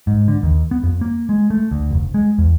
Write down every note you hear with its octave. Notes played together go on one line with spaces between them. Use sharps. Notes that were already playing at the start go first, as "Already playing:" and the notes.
G#2
D3
D#2
B3
F2
A#3
G#3
A3
D2
F1
G#3
E2